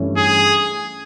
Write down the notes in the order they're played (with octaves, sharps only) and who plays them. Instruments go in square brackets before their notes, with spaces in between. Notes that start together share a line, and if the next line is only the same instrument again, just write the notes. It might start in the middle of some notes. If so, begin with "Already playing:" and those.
Already playing: [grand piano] G2 E3 A3 C#4
[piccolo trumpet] G#4